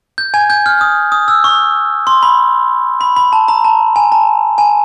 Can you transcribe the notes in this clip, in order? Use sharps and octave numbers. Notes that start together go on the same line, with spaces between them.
G6
G#5 G#6
G6
F6
D#6
D#6
E6
C#6
C6
B5
B5
B5
A5
A#5
A5
G#5
A5
G#5